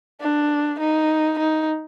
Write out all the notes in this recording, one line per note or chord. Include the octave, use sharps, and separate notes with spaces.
D4
D#4
D#4